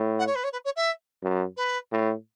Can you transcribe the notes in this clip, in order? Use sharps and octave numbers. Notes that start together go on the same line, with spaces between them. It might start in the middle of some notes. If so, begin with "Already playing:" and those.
Already playing: A2
F#5
C#5
B4
C#5
B4
C#5
E5
F#2
B4
A2